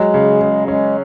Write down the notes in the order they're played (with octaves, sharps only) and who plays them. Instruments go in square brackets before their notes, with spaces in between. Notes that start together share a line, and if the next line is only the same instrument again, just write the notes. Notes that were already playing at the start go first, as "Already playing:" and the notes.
Already playing: [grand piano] F#3 [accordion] G#3
[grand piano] C#3
C#3
[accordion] G#3 [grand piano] C#4